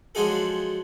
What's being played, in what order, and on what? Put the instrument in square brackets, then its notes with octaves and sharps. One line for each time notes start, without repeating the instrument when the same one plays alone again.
[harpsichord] F3 F#3 G#3 D4 G#4 A4